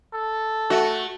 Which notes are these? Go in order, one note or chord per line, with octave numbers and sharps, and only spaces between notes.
A4
A3 F#4